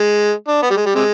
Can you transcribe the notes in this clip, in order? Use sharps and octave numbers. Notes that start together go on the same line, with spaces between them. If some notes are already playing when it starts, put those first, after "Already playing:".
Already playing: G#3
D4
B3
G3
G#3
G3
C3 G#3